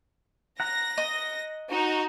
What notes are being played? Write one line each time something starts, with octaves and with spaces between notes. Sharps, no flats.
F#5 A#5 A#6
D#5
D#4 F#4